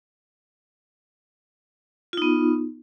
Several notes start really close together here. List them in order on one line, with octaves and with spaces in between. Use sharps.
F4 D#4 B3